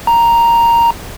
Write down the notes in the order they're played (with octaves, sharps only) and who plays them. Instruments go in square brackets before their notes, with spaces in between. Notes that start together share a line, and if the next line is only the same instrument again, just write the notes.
[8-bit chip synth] A#5